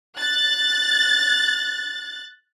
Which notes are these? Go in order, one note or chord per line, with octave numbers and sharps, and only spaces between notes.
F#6 A6